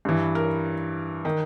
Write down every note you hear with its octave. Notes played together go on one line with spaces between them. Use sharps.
G2 E3
A#4
D#3